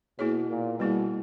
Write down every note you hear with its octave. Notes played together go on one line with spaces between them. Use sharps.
B2 A#3 E4 G#4 C#5
A#2
B2 G3 A#3 E4 G#4